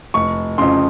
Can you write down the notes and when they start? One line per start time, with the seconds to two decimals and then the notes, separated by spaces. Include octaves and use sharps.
0.14 F1 C#6
0.58 F2 C#3 C6